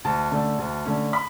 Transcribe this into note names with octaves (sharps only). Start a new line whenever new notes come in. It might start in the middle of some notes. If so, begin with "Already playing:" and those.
D2 A5
D3 A3 C#4
D2
D3 A3 C#4
B5